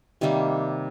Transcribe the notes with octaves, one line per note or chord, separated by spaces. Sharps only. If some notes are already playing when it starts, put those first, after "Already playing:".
C3 D#3 G3 A#3